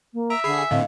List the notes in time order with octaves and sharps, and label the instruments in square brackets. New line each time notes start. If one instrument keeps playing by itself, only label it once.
[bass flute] A#3
[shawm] E5 [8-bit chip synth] A#5 [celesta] D7
[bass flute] D3 [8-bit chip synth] G#4 C7 [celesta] B5
[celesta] G#5
[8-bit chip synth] A2 D3 [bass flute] C4 [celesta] D#5 F5